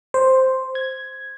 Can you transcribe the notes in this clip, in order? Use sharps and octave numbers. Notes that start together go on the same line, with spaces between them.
C5
G#6